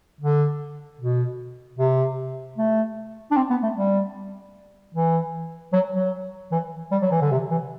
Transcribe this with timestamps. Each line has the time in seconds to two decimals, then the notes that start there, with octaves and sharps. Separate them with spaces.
0.21 D3
1.00 B2
1.79 C3
2.57 A3
3.31 D4
3.37 C4
3.50 B3
3.63 A3
3.76 G3
4.94 E3
5.73 F#3
5.93 F#3
6.52 E3
6.91 G3
7.02 F#3
7.11 E3
7.21 D3
7.31 C3
7.51 E3